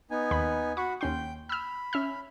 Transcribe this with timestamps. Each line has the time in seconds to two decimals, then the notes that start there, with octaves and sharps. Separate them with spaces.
0.11 B3 D#4 G#5
0.31 D#2 B5
0.77 F#4 F#5 B5 C#6
1.01 D#2 C#4 G5 C6 G6
1.49 B5 E6 F6
1.93 C#4 E5 F6